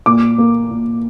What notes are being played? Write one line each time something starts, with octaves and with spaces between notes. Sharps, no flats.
A#2 D6
A#3
A#2